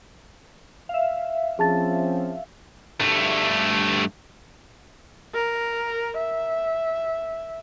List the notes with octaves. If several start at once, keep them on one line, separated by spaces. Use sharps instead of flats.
E5 F5
F3 C4 C#4 G#4 A5 A6
G2 A3
A#4
E5